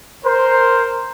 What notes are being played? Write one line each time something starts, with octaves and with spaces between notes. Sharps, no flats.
A#4 C5